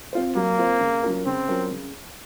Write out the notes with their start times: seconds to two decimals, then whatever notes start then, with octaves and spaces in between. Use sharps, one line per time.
0.13 C4 F4 C5
0.35 F#3 A#3
0.58 C4 F4 C5
0.80 C#3
1.03 F#3 C#4 F4 A#4
1.26 C#3 C4
1.48 F#3 C#4 F4 A#4
1.71 C#3